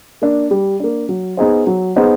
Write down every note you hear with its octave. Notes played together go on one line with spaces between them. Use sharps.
A#3 D4
G3
A#3 D4
F#3
B3 D#4 G#4 C5
F#3
B3 D#4 G#4 C5